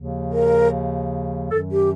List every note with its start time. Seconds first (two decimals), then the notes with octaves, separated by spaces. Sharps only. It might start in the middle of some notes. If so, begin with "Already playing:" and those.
Already playing: D#2 C#3 F3
0.32 A#4
1.51 F#2 D#3 F#3 A4
1.72 G4